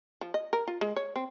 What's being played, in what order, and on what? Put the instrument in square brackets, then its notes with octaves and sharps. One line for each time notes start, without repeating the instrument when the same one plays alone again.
[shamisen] F3
D#5
A#4
F4
G#3
C#5
C4